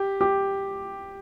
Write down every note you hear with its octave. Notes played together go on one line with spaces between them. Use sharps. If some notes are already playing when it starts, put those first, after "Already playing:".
Already playing: G4
G4